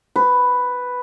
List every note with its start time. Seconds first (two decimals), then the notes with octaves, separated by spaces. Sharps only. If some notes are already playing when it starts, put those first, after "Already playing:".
0.16 B4